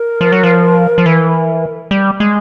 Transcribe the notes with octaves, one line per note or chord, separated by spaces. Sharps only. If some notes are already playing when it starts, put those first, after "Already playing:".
Already playing: A#4
F3
F#3
F3
F3
E3
G3
G#3